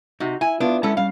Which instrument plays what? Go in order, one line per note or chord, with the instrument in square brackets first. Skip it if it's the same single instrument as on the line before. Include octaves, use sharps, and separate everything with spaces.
[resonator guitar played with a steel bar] C3 [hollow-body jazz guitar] D#4 F#4
[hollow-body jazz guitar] E4 [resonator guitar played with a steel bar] G#5
[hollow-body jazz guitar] B3 E4 F4 [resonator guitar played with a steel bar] D4
[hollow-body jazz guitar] G#3 C#4 E4 [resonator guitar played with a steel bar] B3 A4
[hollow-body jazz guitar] G3 C#4 [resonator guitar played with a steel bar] F5